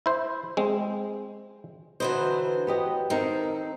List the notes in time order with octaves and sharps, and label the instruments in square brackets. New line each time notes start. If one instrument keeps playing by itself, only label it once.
[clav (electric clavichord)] E4 C5
G#3 C4
[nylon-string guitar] D3 B4 D#5 [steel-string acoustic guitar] E3 F#3 C5
[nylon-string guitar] B3 G4 D#5
[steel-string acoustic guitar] D#3 A4 [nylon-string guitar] C4 D#4 A#4